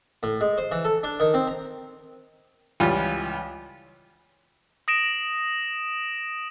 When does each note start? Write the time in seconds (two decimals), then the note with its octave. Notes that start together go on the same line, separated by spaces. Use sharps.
0.23 A2
0.41 G#3
0.58 C5
0.71 E3
0.85 A4
1.03 D4
1.20 D#3
1.34 C4
1.47 A#5
2.80 C#2 E3 G3 F4
4.88 D#6 A#6 D7 E7